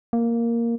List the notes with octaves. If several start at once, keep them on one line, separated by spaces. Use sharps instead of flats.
A#3